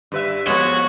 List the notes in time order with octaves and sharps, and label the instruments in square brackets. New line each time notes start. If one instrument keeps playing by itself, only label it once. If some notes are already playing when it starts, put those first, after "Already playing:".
[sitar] G2 B4 E5
[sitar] F2 [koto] G#3 B3 [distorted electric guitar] F#4 [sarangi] C#5